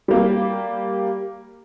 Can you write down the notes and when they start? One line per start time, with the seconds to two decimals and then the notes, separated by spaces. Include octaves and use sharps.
0.08 G3 A#3